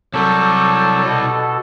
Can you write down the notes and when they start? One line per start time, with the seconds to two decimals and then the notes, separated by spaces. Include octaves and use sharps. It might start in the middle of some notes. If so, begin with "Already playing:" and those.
0.14 C2 F#3 G3 A4 A5
1.05 B2 A4